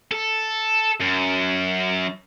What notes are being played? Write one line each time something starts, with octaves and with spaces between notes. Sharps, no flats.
A4
F#2